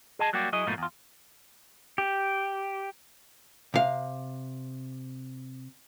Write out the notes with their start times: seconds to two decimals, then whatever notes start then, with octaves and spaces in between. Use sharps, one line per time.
0.19 G#4 D#5 A5
0.33 F#3 G3 A#3 F#4 G4
0.53 F#3 E4 G#4 D#5
0.67 G#2 B2 F3 A3 A#3 D#4
0.78 E2 F4
1.98 G4
3.74 C3 F5